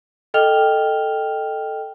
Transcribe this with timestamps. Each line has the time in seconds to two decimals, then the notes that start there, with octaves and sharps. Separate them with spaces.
0.34 A4 D#5 G5 F6 F7 G7